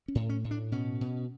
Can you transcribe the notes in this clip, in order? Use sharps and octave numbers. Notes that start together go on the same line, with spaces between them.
C#4
A2
C#4
A2
D4
B2 C#4
B2